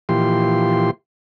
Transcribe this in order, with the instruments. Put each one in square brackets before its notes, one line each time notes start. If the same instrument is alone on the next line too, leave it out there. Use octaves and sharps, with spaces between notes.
[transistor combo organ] A#2 E3 F3 G4 C6